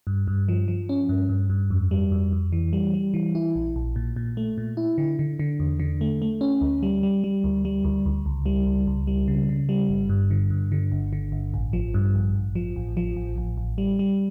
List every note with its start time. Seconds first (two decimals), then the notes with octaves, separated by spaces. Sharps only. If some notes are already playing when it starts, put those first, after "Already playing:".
0.07 G2
0.28 G2
0.48 F3
0.68 F3
0.89 C#4
1.09 G2
1.29 G2
1.50 G2
1.70 F2
1.91 G3
2.12 F2
2.32 F2
2.52 E3
2.73 G3
2.94 G3
3.14 E3
3.35 E4
3.56 A#1
3.76 A#1
3.96 A#2
4.16 A#2
4.37 A3
4.58 A#2
4.77 E4
4.98 D3
5.19 D3
5.39 D3
5.60 E2
5.80 D3
6.01 A3
6.22 A3
6.41 C#4
6.61 D2
6.83 G3
7.03 G3
7.24 G3
7.44 D2
7.65 G3
7.84 D2
8.06 D2
8.26 C#2
8.46 G3
8.67 C#2
8.87 C#2
9.07 G3
9.28 C#3
9.49 C#3
9.69 G3
9.89 G1
10.09 G2
10.31 D3
10.50 G2
10.72 D3
10.92 G1
11.13 D3
11.32 G1
11.54 A1
11.73 F3
11.94 G2
12.15 A1
12.35 A1
12.55 F3
12.76 A1
12.97 F3
13.16 A1
13.38 A1
13.57 A1
13.78 G3
13.99 G3